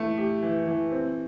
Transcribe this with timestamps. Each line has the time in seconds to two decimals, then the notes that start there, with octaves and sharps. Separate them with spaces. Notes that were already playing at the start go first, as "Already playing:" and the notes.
Already playing: E3 A3 E4
0.18 G4
0.43 E3
0.67 E3
0.92 C4